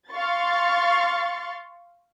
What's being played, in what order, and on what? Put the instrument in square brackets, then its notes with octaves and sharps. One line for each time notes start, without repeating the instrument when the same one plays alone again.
[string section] F5 C6 C#6 A6